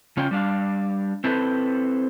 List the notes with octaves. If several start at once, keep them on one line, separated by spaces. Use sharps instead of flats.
C#3 C#4 F4 G5
G3 D4 F5
C4 E4 A4 B4 C5